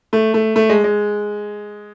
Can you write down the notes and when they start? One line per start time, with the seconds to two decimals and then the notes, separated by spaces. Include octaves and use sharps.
0.13 A3
0.34 A3
0.56 A3
0.69 G#3
0.84 G#3